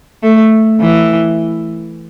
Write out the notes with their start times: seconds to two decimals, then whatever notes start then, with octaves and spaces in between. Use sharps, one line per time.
0.23 A3
0.81 E3